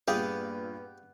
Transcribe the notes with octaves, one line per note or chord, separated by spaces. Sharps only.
G2 A#2 B3 F4 G4 G#4 F5